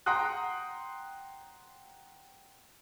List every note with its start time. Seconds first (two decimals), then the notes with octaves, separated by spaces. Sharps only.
0.06 F#5 G5 A#5 C6 D#6 F#6